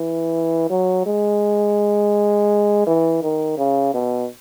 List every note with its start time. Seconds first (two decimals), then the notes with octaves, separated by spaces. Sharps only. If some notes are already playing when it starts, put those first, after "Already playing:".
Already playing: E3
0.70 F#3
1.06 G#3
2.87 E3
3.23 D#3
3.58 C#3
3.94 B2